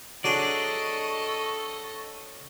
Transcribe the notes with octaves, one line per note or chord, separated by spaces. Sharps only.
F#3 D4 G#4 A4 D5 D#5 C#6